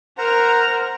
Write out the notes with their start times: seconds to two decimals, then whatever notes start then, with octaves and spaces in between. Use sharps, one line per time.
0.18 A#4 C5 F#5 A#5 F6